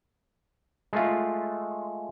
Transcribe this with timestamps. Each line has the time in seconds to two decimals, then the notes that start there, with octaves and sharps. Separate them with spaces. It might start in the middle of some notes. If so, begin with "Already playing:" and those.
0.93 G#3 A3 F4